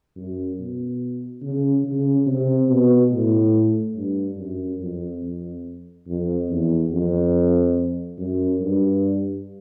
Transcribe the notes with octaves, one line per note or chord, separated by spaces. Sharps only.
F#2
B2
C#3
C#3
C3
B2
A2
G2
F#2
F2
F2
F2
E2
F2
F#2
G2